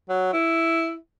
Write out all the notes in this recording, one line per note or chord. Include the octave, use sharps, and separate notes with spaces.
F#3
E4